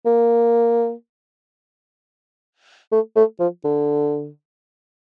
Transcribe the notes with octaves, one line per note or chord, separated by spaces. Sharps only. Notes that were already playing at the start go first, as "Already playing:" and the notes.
A#3
A3
A3
F3
D3